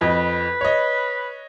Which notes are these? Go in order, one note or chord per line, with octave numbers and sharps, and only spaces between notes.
F2 B4 D#5
C#5 D#5